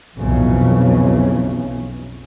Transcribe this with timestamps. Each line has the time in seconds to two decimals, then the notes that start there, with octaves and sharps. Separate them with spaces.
0.17 B1 F2 C#3 E3